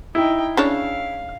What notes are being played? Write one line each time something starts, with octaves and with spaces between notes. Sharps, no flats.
D#4 E4 G5
C#3 D4 C#5 F5